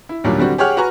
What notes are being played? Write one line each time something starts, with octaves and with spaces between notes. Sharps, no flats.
E4
D#2 A#2 F#3 G3 D4
D3 G3 C4 F#4
G4 G#4 C#5 F#5 F6
F#4 B4 G#5 A#5 C#6